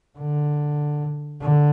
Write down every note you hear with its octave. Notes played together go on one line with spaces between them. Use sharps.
D3
D3